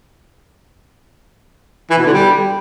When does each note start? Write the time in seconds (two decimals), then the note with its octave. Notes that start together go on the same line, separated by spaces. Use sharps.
1.90 E3
1.98 B2
2.06 D3
2.13 G3